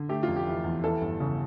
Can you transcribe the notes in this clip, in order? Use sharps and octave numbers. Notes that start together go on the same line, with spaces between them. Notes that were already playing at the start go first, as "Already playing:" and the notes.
Already playing: D3
A3 G4
F1 F4
G4
E3
E2
E3 A4
G1
C#3